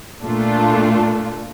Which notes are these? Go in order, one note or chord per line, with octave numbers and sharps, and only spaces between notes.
A#2 A3 D4 F4